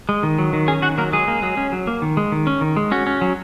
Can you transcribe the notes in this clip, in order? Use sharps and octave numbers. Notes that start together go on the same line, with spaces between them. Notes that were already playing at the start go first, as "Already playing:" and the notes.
G#3
D#3
F#3
D#3
C#4 G#4 G#5
D#3 F#4 F#5
F#3 A#3 A#4
F#3 G#3 G#4
A#3
F#3
C#4
F#3
A#3
D#3
G#3
D#3
C#4
D#3
G#3
C#4 F#4
C#4
F#3